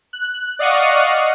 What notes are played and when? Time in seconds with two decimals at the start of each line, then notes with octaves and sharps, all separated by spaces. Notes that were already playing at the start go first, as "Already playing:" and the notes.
0.13 F#6
0.59 D5 D#5 F5 F#5 C#6 D#6